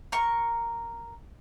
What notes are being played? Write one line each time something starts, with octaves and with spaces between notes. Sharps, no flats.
A#4 C#6